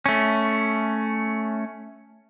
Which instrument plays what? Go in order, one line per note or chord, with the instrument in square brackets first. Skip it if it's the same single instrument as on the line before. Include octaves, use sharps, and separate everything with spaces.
[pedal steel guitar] A3 C#4